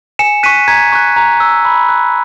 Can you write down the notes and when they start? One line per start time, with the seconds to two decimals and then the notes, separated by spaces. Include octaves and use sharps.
0.19 G#5 C#7 E7
0.43 C#6 F#6 B6 D#7
0.68 A#5 G#6 B6
0.92 C#6 F#6
1.16 A#5
1.40 E6
1.65 B5
1.89 F#6